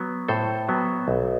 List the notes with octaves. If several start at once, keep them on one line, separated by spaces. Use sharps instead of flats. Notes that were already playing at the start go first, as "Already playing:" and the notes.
Already playing: F#3 B3
A2 A4 C5
F#3 B3
B1